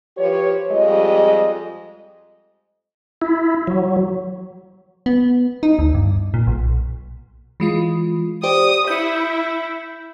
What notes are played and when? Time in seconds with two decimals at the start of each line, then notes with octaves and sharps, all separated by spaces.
0.17 F3 G4 B4 C#5
0.70 F2 G3 G#3 D#5
3.22 E4
3.67 F#3
5.06 B3
5.63 D#4
5.79 D2
5.95 G2
6.34 A#2
6.47 B1
7.60 E3 G#3 F4
8.43 G4 C5 D5 D#6
8.87 E4 G6 C#7